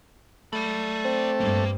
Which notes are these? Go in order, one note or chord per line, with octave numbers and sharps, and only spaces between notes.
A3 D5 B5
C4
G2 A#3